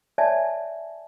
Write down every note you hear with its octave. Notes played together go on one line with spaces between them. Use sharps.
C#5 D5 E5 G#5 A5